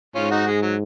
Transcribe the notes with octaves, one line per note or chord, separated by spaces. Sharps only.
G#2 C#4 F4
D#4 F#4
G#3
F#3